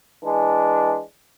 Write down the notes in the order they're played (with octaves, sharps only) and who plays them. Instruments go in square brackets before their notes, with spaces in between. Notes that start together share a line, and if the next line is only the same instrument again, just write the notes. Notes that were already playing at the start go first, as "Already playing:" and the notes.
[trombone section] E3 G#3 D4